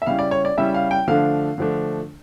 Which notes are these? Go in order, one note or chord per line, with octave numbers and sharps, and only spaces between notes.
E5
C#3 G3 C#4 E4 F5
D5
C#5
D5
C#3 G3 C#4 E4 E5
F5
G5
D3 F3 A3 D4 F5
D3 F3 A3 D4